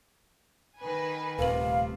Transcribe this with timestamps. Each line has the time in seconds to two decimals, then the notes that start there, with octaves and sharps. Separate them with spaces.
0.79 D#3 B4 G#5
1.39 D#1 C3 A3 A#4 B4 F5 F#7